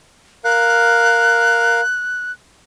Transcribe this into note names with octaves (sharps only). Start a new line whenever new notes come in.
A#4 F5 F#6